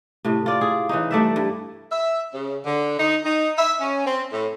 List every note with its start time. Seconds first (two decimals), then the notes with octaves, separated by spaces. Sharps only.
0.25 A2 C3
0.46 F4 D5
0.61 G#4
0.89 E3 C#4 D#4
1.11 G3 A3 D5 E5
1.36 G2
1.92 E5
2.34 C#3
2.65 D3
2.99 D#4
3.24 D#4
3.58 E5
3.81 C#4
4.06 C4
4.32 A2